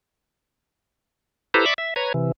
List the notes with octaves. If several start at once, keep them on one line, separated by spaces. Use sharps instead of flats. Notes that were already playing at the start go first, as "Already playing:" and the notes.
E4 G4 A4 B4 C5 A#5
D5 E5 B5 C#6 D6
E5
B4 C#5 A#5 G#6
C3 E3